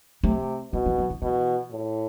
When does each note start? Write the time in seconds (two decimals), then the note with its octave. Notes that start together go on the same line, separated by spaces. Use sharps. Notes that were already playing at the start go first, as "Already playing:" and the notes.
0.23 C3 A3
0.73 B2 E3
0.86 E3
0.98 F3
1.10 E3
1.22 B2 E3
1.72 A2